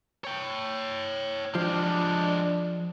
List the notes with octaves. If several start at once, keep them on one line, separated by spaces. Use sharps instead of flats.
C#5 G5
F3 G#3 D4 G4